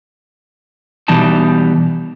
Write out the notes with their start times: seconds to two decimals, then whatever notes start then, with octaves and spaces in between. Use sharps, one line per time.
1.08 B2 E3 G3 D#4 A5